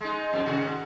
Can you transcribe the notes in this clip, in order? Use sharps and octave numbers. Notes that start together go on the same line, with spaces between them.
G#3 D#4
F2 A#2 C4
C3 D#3 F#4
G#2